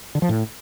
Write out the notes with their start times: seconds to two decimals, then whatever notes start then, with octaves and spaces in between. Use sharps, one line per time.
0.15 D3
0.22 F3
0.29 A2